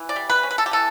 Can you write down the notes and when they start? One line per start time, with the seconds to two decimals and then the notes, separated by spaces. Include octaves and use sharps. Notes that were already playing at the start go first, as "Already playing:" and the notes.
Already playing: E3
0.09 D5
0.16 G3
0.30 B4
0.43 C#4
0.51 B4
0.58 A4
0.66 G4
0.71 E3 A4